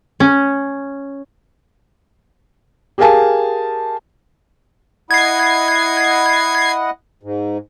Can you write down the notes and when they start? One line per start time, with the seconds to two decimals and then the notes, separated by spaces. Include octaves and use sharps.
0.20 C#4
2.98 G4 G#4 A#4 F5 G#5 A5
5.11 E4 D#5 F#5 G#6 C7
7.23 G#2